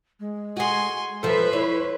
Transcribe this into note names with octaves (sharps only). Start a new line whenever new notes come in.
G#3
F#4 G#4 G#5 C6
F3 A4 B4 C5 E5
E4 C#5